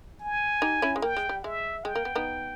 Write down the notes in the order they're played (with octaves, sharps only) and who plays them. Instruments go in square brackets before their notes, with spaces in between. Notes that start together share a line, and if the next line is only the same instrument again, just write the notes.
[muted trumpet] G#5
[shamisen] D#4 G4
C#4 E4
G#3
[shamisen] A#3 [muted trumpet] G5
[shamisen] G#3
G3
[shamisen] G#3 [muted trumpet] E5
[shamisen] G#3 [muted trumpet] G5
[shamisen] A#3
B3
B3 D#4